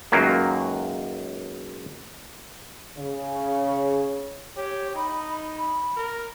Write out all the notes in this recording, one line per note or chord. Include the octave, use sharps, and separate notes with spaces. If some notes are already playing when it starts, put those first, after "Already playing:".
C#2 F#2 D#3 F#3 A#3
C#3
G4 C#5
D#4 B5
B5
A#4